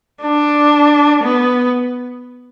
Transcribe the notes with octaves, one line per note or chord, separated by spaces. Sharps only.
D4
B3